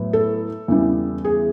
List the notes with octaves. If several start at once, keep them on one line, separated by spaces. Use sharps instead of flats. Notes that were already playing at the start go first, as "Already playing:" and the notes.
Already playing: A2 F#3 B3
A4
E2 C#3 E3 G3
G#4